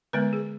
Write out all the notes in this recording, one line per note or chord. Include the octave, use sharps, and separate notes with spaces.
D3 G#3 B3 B4
G#4